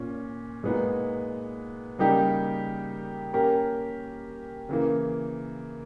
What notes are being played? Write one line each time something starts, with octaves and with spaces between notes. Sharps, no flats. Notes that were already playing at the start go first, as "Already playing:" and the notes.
Already playing: A#2 C#4
A#2 G#3 B3 D#4
C#3 G3 A#3 D#4 G4
A#3 C#4 G4 A#4
C#3 E3 A#3